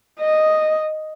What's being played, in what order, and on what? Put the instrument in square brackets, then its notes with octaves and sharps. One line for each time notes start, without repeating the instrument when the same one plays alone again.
[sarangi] D#5